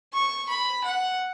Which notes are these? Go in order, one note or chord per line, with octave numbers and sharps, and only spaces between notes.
C#6
B5
F#5